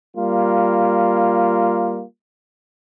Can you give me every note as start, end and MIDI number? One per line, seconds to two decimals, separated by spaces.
0.17 2.03 55
0.17 2.03 58
0.17 2.03 65